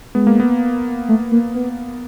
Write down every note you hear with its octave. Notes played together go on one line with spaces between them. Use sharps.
G#3 B3
A#3
B3
A3
A#3
B3